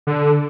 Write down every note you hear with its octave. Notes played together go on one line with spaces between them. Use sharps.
D3